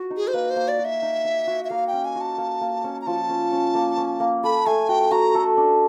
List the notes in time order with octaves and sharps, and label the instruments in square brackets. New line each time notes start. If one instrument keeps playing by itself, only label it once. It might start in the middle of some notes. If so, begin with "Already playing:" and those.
Already playing: [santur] F#4
D#4
[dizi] G#4
C5
[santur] A#3 [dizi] B4
[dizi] C5
[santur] A#3
[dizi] D5
[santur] F#4
[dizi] E5
[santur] D#4
D#4
F#4
[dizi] E5
[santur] A#3 [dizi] F5
[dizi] G5
[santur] C#4
[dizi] G#5
[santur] F#4 [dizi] A5
[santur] A#3
A#3
C#4
[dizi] A#5
[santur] F3 [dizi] A5
[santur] C#4
C#4
A#3
C#4
A#3
[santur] A4 [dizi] B5
[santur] A3 [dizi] G#5
[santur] F#4 [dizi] G5
[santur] F#4 [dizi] A#5
[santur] A4
D4